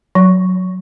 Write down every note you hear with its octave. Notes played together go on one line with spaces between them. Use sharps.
F#3